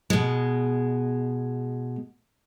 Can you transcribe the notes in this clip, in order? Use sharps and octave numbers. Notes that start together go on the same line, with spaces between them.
B2 G#3